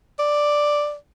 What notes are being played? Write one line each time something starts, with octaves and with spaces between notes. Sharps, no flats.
D5